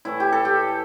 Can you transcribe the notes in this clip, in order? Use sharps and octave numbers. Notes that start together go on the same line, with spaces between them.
A2 E3 A3 E4
G4
A4
G4